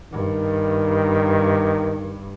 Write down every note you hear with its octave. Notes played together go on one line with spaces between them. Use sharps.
G2 D#3